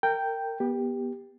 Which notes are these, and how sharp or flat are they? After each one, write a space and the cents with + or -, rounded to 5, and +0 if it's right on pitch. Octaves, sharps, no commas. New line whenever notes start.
A#4 -30 G5 +0
B3 -25 G4 +10